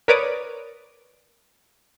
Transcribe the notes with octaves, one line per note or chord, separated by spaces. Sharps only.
A#4 B4 C#5 D5 D6 D#6